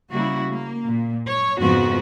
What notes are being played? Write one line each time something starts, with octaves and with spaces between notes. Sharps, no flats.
C#3 G3 A#3 E4 F#4
A#3
A#2
C#5
F2 G#2 C#3 F3 B3 F#4